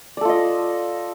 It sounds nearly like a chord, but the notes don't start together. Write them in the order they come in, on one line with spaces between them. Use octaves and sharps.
D5 A4 F4 D#5